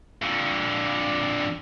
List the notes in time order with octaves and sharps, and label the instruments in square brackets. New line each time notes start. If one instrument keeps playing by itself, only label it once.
[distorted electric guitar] F2 D3